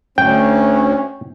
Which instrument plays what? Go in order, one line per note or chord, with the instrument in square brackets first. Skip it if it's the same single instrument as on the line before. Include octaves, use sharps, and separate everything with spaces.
[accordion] D2 [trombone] C#4 [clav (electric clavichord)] G5